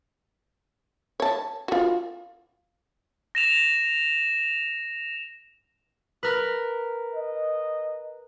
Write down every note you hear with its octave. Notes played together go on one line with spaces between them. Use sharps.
C#5 A5
F4 F#4
A#6 E7 F7
A#4 B4
D#5